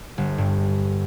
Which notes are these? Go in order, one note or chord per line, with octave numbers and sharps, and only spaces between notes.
G1
G2